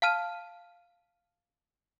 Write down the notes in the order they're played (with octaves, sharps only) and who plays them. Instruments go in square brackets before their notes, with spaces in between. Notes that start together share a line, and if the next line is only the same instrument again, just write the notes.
[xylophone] F5 A5 F6 D#7